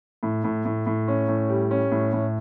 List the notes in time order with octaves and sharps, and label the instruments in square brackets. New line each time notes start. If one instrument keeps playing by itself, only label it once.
[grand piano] A2
A2
A2
A2
C#4
A2
G3
C#4
A2
A2